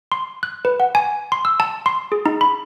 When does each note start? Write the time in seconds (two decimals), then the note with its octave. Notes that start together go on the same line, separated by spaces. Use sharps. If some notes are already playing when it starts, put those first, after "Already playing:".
0.12 C6
0.43 F#6
0.65 B4
0.80 F#5
0.95 G#5
1.32 C6
1.45 E6
1.60 A5
1.86 C6
2.12 G#4
2.26 D#4
2.41 B5